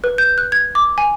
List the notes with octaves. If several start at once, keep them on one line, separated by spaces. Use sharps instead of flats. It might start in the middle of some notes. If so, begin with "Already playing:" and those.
B4
G6
F#6
G#6
D6
G#5